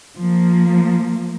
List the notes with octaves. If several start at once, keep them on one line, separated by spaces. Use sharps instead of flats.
F3 A#3